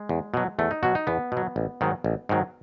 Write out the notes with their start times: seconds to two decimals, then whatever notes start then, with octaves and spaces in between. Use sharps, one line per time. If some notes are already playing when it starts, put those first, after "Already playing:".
Already playing: G#3
0.09 E2
0.34 B2 F#3
0.59 E2 A3
0.71 D#4
0.83 B2 F#3 F#4
0.95 D#4
1.07 E2 B3
1.32 B2
1.37 F#3
1.56 A1
1.81 G#2 D#3 F#3
2.04 A1
2.29 G#2 D#3 F#3